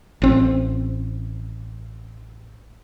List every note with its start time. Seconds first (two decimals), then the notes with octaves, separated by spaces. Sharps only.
0.22 A1 C4